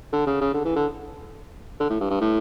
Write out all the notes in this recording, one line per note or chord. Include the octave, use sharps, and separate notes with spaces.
D3
C#3
C#3
D3
E3
D3
D3
A2
G2
G2
A2